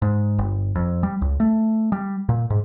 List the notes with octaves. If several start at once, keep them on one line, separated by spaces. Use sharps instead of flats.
G#2
G1
F2
G3
C#2
A3
G3
A#2
G#2